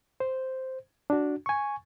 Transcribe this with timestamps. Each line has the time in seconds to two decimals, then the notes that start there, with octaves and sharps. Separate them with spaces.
0.20 C5
1.10 D4 F#4
1.46 G#5 C#6